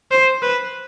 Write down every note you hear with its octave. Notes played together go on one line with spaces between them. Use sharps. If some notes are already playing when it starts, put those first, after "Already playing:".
C5
B4